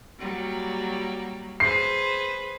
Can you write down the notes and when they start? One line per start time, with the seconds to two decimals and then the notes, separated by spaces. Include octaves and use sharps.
0.19 F#3 G3 A#3
1.60 G#4 B4 C5 C7